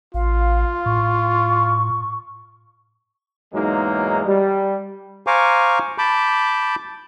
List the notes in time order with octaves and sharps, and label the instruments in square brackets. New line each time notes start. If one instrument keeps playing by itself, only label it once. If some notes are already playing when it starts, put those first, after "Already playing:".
[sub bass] A1 [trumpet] F4 [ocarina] F5
[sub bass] A2 [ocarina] C#6
[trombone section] E2 G#2 F#3 G#3 A#3 D#4
G3
[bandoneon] C5 F5 G#5 A#5 C#6 D6
A5 B5 D6 G6